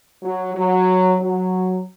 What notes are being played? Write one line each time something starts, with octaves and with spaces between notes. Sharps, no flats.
F#3
F#3
F#3